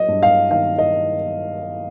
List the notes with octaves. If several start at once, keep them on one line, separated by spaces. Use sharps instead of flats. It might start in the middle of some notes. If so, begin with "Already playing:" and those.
Already playing: F#3 D#5
G2
F5
D#3 F5
D#5